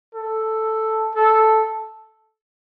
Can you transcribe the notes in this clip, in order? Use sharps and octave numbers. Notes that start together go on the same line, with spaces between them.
A4
A4